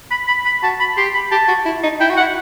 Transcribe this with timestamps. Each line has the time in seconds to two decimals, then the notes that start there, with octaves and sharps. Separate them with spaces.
0.11 B5
0.28 B5
0.45 B5
0.63 F#4 A5
0.80 B5
0.97 G4 C6
1.14 B5
1.31 G4 A5
1.48 F#4
1.65 E4
1.84 D#4
2.00 E4 G5
2.10 F#4
2.17 F#5
2.21 E4